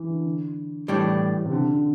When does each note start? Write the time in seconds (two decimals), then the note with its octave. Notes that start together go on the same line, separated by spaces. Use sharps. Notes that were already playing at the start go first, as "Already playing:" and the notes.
Already playing: E3
0.09 D3
0.88 A2 E3 G3 D4 G4
1.45 C3
1.51 D3
1.75 D3